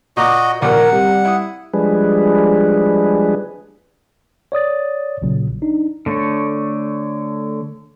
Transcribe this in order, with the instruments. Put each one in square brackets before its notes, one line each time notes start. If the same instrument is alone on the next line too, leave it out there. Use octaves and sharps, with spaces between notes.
[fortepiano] A#2 A#5 D6 [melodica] F#4 D#5
[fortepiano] A#1 D#2 A#2 [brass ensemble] A#4 [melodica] F#5
[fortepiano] C3 [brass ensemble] G3
[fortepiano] E4 D#6
[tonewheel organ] F3 G3 G#3 D4 G#4 B4
[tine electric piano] C#5 D5 D#6 A6
A#1 A#2 C#3 F#3
D4 D#4
[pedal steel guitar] D3 A3 C#5